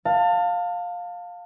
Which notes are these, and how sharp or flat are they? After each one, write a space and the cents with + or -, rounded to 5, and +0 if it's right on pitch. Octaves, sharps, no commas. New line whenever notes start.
F5 +15 A5 +30